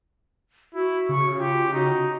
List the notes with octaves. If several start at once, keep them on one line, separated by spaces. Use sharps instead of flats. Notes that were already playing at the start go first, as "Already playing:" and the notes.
E4 F#4
C#3 C#6
F4 G4
D#4 F#4